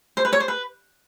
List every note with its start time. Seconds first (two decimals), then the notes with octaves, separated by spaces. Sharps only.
0.17 C5
0.25 B4
0.33 C#5
0.40 C5
0.48 B4